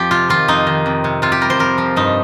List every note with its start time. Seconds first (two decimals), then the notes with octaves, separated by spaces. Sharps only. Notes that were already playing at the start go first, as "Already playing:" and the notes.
Already playing: F2 F3 G4
0.11 C3 F4
0.29 D#3 F4
0.48 F2 D#4
0.67 D#3
0.86 F2
1.04 C3
1.22 C3 F4
1.32 G4
1.41 G3 A#4
1.50 C5
1.59 F2 A#4
1.78 F3
1.96 G2 D#4